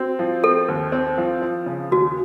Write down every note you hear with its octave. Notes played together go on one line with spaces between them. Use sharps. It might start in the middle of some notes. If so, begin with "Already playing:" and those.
Already playing: C4 F#4
F3
C4 A4
D#2
C4
F3
F3
C#3
D#2 F#4